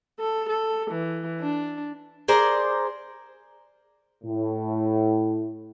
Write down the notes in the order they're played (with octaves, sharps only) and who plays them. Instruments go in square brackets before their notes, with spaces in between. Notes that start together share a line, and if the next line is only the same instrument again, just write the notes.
[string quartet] A4
A4
E3
D4
[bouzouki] G#4 A#4 C5 D5
[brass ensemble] A2